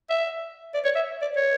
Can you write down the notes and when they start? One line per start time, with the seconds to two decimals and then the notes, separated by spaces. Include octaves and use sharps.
0.10 E5
0.74 D5
0.84 C#5
0.95 E5
1.22 D5
1.36 C#5